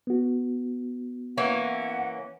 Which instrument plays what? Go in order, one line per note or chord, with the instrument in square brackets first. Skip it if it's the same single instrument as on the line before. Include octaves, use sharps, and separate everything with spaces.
[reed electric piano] B3 F#4
[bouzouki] E3 A#3 C#4 [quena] F#5